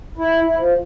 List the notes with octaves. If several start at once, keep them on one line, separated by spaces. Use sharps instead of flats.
E4
E4
F3